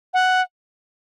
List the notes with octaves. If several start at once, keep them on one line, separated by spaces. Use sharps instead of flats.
F#5